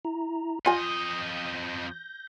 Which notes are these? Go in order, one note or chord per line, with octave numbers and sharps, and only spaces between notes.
E4 A#5
F2 F4 D#5 G#5 G6 A#6